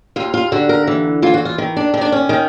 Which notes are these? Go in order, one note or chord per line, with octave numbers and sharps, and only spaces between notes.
D#2 F4
F4
D3 F#4
A#4
E3
E3 F4
F#4
F4
D#3
D4
D#3
D4
C#4
D#3